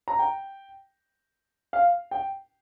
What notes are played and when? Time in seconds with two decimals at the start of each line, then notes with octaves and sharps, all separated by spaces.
0.08 A#5
0.19 G5
1.73 F5
2.11 G5